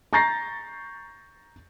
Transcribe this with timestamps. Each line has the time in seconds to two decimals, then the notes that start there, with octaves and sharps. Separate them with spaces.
0.13 A#5 C#6 G6 A6 A#6 C7